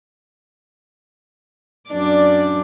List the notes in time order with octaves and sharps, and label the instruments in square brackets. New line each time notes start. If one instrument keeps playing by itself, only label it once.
[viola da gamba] F#2 D4 D5